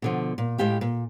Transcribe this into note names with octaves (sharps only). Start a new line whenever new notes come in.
B2 D3 F3
A#2
A2 G#3 G4 F5
A#2